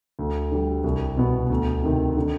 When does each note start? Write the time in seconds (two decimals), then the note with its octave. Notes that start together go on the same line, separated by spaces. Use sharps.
0.19 D2
0.51 D3 G3
0.84 C2
1.17 B2 B3
1.50 D2
1.83 C3 D#3
2.17 D3